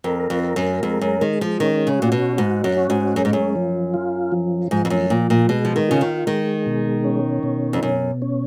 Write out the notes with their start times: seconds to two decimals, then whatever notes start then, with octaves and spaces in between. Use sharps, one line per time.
0.04 F2 A#4
0.30 F2
0.43 A#4
0.56 F#2
0.83 F2 G#3
1.01 F#2
1.21 D#3 G#3
1.41 F3
1.60 D#3 C#4
1.87 C#3
1.99 A#2 F#4
2.12 B2
2.37 G#2 F#4
2.64 F#2
2.77 C#4
2.90 G#2
3.15 F#2 G#3
3.25 G#2
3.33 F#2
3.55 F3
3.94 F4
4.32 F3
4.71 G#2 F3
4.85 F2
4.90 F#2
5.10 A#2 F3
5.30 A#2
5.49 B2 G#3
5.65 F3
5.76 D#3
5.89 C#3 F4
6.01 D#3
6.27 D#3 G#3
6.66 B2
7.04 C#4
7.43 B2
7.73 F2
7.83 F#2 B2
8.22 C#4